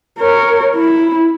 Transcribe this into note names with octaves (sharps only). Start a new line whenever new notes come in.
A#4 C#5
E4